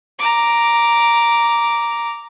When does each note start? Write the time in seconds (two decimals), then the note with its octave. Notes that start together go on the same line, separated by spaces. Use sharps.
0.19 A#5 D6